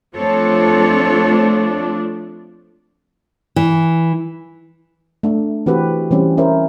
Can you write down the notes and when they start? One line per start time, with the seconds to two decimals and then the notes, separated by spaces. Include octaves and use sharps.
0.15 F3 A3 C4 D4 A4 C#5
3.56 E3
5.23 A3 D4
5.66 E3 C4 F#4 G4 B4
6.11 E3 G3 C4 C#4
6.37 C#4 E4 A#4 C5